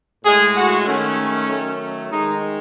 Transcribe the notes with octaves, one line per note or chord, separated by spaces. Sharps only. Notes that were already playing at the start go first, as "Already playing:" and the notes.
A2 G#3 G#4
F#4
D#3 A3 C#4
D#3 F#3 A3
D#3 G#3 D#4